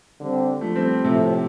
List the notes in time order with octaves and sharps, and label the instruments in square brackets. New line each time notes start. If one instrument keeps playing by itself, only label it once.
[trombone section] D3 G3 C4
[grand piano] F3 A3
G3 C4
[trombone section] A2 A3 C4 A4 [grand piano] C3 F3